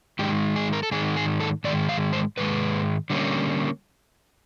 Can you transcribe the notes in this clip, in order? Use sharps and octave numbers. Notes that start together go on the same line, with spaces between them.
G#2 D#3 G#3 G4
G#4
A#4
A4
G#2 D#3 G#3 G#4
G#4
A4
G#2 D#3 G#3 D5
F5
C5
G#2 D#3 G#3 B4
D3 G3 A#3 C#4